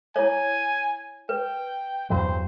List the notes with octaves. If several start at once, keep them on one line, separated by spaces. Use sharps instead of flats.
E4 C#5 G#5
B4 G5
E2 G2 F#3 C5